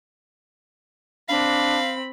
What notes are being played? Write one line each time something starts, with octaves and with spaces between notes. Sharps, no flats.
C4 D4 F5 B5